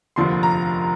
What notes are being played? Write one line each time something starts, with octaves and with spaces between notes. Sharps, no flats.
F1 D#2 D3 F3 C6
A#5